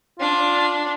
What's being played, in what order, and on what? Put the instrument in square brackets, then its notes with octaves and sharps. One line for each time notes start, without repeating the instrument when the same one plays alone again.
[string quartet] D4 [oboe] F4